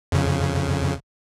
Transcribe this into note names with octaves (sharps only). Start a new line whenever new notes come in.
F2 C#3